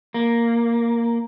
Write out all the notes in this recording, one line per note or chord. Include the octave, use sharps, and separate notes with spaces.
A#3